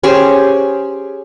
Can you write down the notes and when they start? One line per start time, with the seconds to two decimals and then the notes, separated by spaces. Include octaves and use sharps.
0.03 C#4 G4 G#4 C5